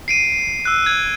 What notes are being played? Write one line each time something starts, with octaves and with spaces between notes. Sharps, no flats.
C7 D7 D#7
E6 F#6
G#6